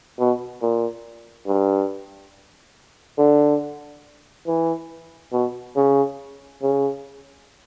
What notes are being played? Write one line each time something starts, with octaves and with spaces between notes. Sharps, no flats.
B2
A#2
G2
D3
E3
B2
C#3
C#3